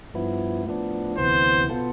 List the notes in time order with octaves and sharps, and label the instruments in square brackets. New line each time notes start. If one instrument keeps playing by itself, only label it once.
[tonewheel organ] G2 F3 B3 E4
A2 F3 B3 D4
[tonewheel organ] D2 C3 E3 B3 [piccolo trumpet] C5
[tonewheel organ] B2 B3 F4 A4